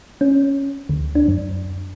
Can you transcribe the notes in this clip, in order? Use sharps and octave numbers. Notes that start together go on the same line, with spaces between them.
C#4
D2
D4
F#2